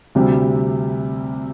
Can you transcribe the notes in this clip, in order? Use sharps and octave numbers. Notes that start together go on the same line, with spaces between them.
D2 C3 G3 C4 G4